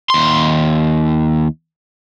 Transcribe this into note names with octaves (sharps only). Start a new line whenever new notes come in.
D#2 C6